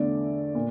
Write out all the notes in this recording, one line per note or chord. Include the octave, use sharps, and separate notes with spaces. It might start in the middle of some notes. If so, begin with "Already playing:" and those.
Already playing: E2 D3 A3 D5
A#2